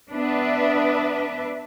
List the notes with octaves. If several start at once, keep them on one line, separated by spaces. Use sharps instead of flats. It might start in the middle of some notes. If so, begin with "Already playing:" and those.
B3 D4 B4 E5